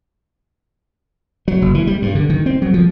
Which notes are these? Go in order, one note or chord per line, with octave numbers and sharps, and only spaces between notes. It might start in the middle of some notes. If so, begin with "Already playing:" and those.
F#3
F#1
E3
G3
G2
D3
D#3
C4
F#3
F3